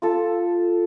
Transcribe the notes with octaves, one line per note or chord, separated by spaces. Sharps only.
F4 A4